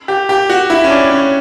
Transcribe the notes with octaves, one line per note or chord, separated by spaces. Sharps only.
G4
G4
F#4
E4
C#4
D4
C#4